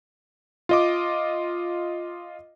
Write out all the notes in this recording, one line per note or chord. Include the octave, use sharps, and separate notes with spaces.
F4 D#5 D6